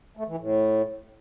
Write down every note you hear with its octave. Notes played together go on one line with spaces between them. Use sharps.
A3
E3
A2